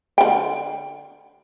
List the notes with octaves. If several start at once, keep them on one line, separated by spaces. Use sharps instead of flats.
D3 G5